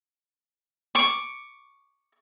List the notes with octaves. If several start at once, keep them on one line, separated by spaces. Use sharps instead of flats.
C#6 D6